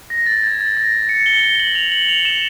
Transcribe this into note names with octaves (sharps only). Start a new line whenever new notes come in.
A#6
A6
G#6
A6
A#6
C#7
G7
G7
F#7
F7
F#7
F7
E7